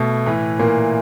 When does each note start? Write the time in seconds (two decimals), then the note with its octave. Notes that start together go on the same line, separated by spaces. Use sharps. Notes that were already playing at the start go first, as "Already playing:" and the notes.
Already playing: B2 A3
0.26 A2 E3
0.59 A#2 A#3